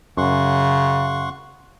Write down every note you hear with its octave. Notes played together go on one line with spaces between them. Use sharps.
F#2 C#3 F#5 C6 C#6